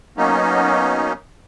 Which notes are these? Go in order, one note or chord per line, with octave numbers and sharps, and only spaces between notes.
F#3 A#3 B3 C#4 D#4